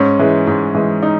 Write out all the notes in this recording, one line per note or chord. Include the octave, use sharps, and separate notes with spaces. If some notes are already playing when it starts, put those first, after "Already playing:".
Already playing: G#2 C#4
E3 G#3
G#2
E3 G#3
D#4